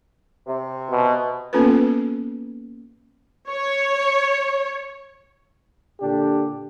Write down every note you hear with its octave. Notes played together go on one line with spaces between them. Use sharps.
C3
B2
A#3 B3 C#4 F4 A4 B4
C#5
A#2 D3 D4 G4